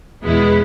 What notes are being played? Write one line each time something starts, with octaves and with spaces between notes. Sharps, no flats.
E2 B2 G#3 B3 E4